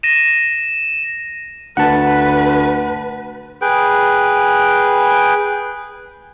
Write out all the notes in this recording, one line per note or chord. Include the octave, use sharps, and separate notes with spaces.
A#6 D#7 E7
D2 B4 F#5 A5
G#4 B4 G5